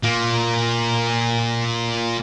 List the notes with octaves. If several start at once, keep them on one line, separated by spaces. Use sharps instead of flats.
A#2 A#3